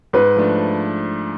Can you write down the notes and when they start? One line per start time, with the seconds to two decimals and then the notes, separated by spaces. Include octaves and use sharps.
0.13 G#2 B4
0.36 F3 A3 D4